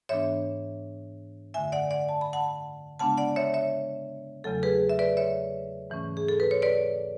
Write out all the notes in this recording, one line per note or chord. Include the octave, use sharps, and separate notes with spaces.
G#2 E3 B3 D4 C#5 E5
F#2 D3 A3 E5 G#5
D5 F#5
D5 F#5
A5
B5
F#5 A5
C#3 G#3 B3 D4 F#5 A5
D5 F#5
C#5 E5
C#5 E5
E2 C#3 F#3 A3 A4
G#4 B4
E5
B4 D5
C#5 E5
G#2 E3 A3 C#4
G#4
A4
B4
C#5
B4 D5